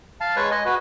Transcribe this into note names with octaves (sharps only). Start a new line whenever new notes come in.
F5 A5
G#3 B4 C#5 C#6
D#5 G#5
F#4 B4